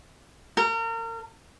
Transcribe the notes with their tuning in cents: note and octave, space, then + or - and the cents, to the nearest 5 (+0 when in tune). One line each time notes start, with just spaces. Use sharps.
A#4 -35